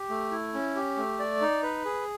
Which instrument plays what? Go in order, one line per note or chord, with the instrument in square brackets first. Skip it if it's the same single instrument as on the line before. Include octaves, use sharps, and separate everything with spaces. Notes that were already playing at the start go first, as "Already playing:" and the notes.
Already playing: [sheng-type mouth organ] G4
A3
E4
C#4
G4
A3
D5
D#4
B4
G#4